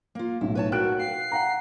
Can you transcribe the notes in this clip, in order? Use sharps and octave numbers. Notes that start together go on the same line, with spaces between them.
A#3 F4
B1 A2 E4
B4 C#5 A5
F#4 A#4 B4 G5 A5 F#6 D7
F5 C7
F#5 G5 A#5